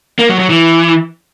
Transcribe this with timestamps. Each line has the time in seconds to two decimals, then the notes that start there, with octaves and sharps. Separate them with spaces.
0.19 A#3
0.29 F#3
0.39 F#3
0.50 E3